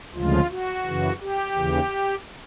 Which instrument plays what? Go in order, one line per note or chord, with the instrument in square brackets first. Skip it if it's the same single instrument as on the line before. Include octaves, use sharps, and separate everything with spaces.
[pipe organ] D2 C#3 F3 G#3 F4
F#4
F#2 C#3 E3
G4
D#2 C#3 E3